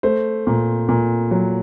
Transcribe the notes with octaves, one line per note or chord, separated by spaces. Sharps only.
A3 C5
A#2
A#2
F#3